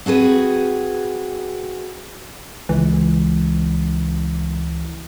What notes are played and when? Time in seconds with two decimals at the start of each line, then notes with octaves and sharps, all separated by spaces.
0.06 C4 F#4 G#4 B4
2.69 C#2 E3